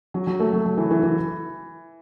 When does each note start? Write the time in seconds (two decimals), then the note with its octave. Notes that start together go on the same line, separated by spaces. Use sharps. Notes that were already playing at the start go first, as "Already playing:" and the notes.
0.14 F#3
0.27 F#3
0.39 A3
0.53 F#3
0.66 F#3
0.77 E3
0.91 E3
1.03 E3